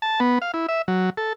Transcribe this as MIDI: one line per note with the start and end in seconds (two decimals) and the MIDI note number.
0.02 0.20 81
0.20 0.39 59
0.42 0.51 77
0.54 0.66 64
0.69 0.82 76
0.88 1.10 54
1.17 1.33 69